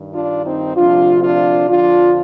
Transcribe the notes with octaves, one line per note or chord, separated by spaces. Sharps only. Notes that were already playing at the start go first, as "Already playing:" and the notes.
Already playing: G2 D#3
D4 F4
C4 D#4
D2 C3 F3 D4 F4
D4 F4
F2 D3 F3 D4 F4